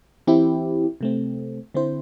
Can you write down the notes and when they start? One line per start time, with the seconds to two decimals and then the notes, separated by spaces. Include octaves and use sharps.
0.27 E3 C4 E4 G4
1.01 C3 A3 C4
1.74 D3 C4 E4 C5